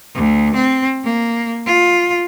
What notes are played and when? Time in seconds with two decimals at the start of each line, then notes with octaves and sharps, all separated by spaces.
0.14 D2
0.55 C4
1.04 A#3
1.66 F4